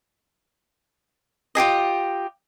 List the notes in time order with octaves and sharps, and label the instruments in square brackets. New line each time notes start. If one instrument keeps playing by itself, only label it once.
[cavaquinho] F4 G4 G#4 D#5